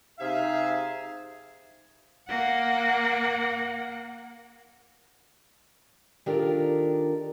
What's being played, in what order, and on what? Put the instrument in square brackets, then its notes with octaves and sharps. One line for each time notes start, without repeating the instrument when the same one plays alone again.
[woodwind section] C3 D#4 G#4 [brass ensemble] E5 F5
[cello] A#3 F#5
[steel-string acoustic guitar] D#3 D4 F4 G4 A4 A#4